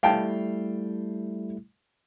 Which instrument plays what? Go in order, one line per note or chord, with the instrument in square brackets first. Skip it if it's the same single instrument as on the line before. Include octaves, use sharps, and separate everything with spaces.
[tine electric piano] G3 A3 E4 [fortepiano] F5 G5 A5